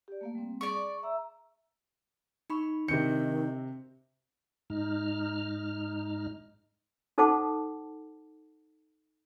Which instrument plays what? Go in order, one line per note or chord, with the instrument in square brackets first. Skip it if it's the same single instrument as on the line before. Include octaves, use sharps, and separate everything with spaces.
[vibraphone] G4 D5
A3 A#3 F5
G3 C4
[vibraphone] G#4 [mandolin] D5 C#6
[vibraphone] E5 A#5 E6
[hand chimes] D#4 B5 C#6
[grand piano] C3 C4 C#7 [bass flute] D#3 [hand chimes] D4 G6
[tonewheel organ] G#2 D#4 F6
[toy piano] D#4 A4 C5 F#5 A5 D6